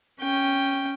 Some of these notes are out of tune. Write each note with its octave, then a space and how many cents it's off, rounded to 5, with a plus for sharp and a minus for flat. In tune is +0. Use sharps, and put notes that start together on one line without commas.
C#4 +0 G5 +0